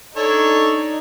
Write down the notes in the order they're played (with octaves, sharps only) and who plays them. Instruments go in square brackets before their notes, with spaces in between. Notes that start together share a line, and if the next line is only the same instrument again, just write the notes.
[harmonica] D4 C#5 [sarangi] D#4 [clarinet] A4